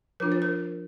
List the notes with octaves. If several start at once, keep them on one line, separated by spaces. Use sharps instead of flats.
F3 D4 F4 A#4
C5
A#4